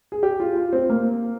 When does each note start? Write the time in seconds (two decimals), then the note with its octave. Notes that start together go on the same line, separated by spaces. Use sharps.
0.12 G#4
0.23 G4
0.40 F4
0.56 F4
0.73 C4
0.90 A#3